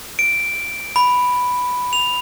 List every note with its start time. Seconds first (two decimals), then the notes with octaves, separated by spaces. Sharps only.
0.19 D7
0.96 B5
1.93 F7